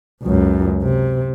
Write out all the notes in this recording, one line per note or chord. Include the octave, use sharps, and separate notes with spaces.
C#2 F#2
C3